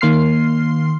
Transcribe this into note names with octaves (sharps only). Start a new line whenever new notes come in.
D#3 A#3 C6 F6 C7